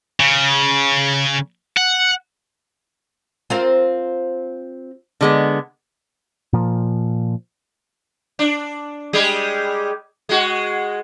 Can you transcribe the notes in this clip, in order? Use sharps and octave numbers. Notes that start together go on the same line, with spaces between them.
C#3
F#5
C4 F4 A#4
D3 G#3 B3
A#2 F3
D4
G3 G#3 G#4
G#3 F#4